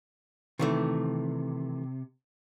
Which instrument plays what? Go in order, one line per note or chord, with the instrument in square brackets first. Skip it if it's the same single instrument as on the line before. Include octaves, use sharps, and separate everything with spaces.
[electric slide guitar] C3 [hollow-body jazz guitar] D#3 E3 A3